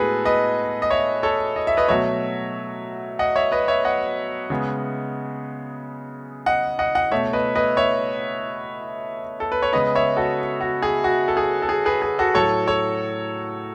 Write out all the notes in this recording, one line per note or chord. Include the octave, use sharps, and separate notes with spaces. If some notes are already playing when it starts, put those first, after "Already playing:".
Already playing: A2 G#3 B3 F#4 G#4 A4 B4
B4 D#5
D#5
C#5 E5
A4 C#5
D#5
E5
B4 D#5
B2 F#3 A3 C#5 E5
D#5 F#5
C#5 E5
B4 D#5
C#5 E5
D#5 F#5
C#3 G#3 B3
D#5 F#5
D#5 F#5
D#5 F#5
B2 A3 C#5 E5
B4 D#5
B4 D#5
C#5 E5
A4
B4
C#5
C#3 G#3 B3 B4 D#5
C#5 E5
F#4 A4
F#4
G#4
F#4
A4
G#4
A4
G#4
G#4 B4
G#4
F#4 A4
A2 F#3 A3 A4 C#5
A4 C#5